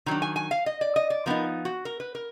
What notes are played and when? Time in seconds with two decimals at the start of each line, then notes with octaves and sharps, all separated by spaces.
0.06 D#3 F#3 D4 A#5
0.22 G#5
0.36 G#5
0.51 F5
0.66 D#5
0.81 D5
0.96 D#5
1.10 D5
1.26 F3 B3 D#4 A#4
1.65 F#4
1.85 A#4
2.00 B4
2.15 A#4